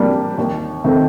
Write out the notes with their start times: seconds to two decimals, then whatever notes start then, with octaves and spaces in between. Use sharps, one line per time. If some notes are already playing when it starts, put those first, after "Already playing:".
Already playing: C3 G3 A#3 D4 G4
0.38 D#2
0.84 D#3 A3 C4